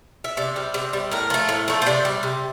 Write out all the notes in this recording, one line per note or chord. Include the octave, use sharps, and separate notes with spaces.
E5
C3 D5
G3
C3
G3
A2 A#4
F3 A3
A2
F3 A3
C5
C3 D5
G3
C3